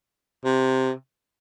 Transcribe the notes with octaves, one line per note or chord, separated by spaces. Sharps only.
C3